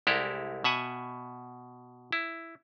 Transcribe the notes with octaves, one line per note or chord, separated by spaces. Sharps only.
C2 G#3 E4 G4 A4 A#4
B2 E5 F#5 G#5
E4